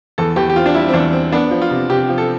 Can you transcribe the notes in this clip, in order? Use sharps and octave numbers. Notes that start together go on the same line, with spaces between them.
E2 A4
E2 G4
G4
C4 F4
D4
G3 E4
C4
E2 D4
C4
B3 D4
F3
F4
C3
C3 G4
F3
A4